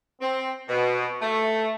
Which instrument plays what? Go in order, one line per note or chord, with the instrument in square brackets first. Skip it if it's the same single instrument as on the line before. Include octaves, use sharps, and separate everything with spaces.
[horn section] C4
B2
A3